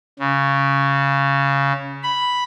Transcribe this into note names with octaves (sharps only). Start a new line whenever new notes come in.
C#3
B5